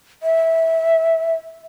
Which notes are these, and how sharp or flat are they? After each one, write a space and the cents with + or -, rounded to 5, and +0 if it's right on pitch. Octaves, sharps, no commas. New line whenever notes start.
E5 -15